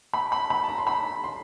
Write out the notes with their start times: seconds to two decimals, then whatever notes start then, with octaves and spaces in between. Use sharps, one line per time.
0.14 B5
0.32 B5
0.50 B5
0.64 A5
0.69 A#5
0.78 C6
0.87 B5
1.24 C6